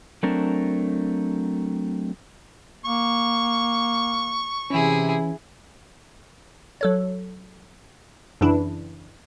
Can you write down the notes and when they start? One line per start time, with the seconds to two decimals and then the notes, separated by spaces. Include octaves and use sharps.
0.23 F#3 A3 C4 D4 A#4
2.85 A#3 C#6
4.70 C3 E3 C#4 E4 G#4
6.81 F#3 A4 C#5
8.41 F#2 C#3 E3 D4 E4